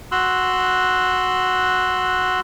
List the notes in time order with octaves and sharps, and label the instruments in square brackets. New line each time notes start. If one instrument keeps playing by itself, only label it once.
[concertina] F#4 C6 E6 F#6